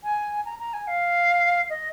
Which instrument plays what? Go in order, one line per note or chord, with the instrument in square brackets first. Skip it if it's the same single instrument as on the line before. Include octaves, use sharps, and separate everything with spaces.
[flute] G#5
A#5
A#5
G#5
F5
D#5